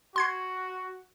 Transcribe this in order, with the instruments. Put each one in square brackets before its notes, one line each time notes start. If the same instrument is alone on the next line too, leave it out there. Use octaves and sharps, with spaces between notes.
[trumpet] F#4 [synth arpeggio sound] C6 G#6 C7